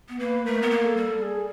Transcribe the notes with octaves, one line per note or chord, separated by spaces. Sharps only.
B3
A#3 B4
A3 A#4
B3
A#3
A4
G3
G#4